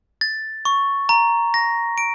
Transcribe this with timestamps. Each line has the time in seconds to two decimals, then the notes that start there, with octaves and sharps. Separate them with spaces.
0.21 A6
0.65 C#6
1.09 A#5
1.54 A#6
1.98 D7